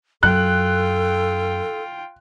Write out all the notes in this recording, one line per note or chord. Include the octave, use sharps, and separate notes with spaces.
F#2 F4 A4 G5 F#6